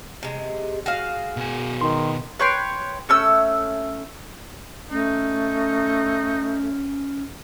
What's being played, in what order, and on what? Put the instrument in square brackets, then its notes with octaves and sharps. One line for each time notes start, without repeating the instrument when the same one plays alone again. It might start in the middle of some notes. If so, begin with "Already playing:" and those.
[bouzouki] C3 G#3
F#4 G#4 F5
[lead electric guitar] B2 G#5
[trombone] D#3 [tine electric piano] C6
[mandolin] B4 C#5 G5 C6
A3 C#4 E6
[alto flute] A3 [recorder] C#4 [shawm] D#4